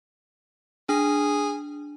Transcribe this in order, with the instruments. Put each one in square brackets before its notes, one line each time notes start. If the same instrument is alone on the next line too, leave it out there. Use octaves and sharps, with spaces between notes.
[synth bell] D4 [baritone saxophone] G#4